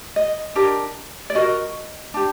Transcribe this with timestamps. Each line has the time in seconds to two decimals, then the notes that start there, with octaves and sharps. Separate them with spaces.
0.16 D#5
0.55 D4 G4 A#4
1.30 D5
1.35 F#4 A#4 D#5
2.14 D4 G4